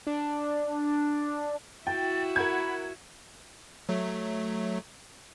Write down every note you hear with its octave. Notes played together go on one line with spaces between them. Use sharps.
D4
E4 F#4 G5 A6
A#4 F#5 B5 G#6
F#3 A3